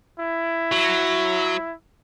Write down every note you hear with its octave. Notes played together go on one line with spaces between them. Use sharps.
E4
F#3